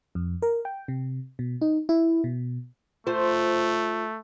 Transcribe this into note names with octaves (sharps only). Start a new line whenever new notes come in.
F2
A#4
G5
C3
B2
D#4
E4
B2
A3 F4 C5